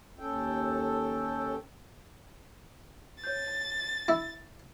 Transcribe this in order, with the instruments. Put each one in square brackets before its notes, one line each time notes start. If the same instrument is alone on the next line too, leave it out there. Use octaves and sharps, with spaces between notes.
[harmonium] D#2 C#4 A4 G5
[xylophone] C#5 G6 [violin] A6
[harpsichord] E4